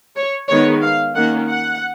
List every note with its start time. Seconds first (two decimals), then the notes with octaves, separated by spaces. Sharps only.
0.16 C#5
0.49 D#3 G#3 B3 C#5
0.82 F5
1.15 D#3 A#3 C#4 F#5
1.49 F#5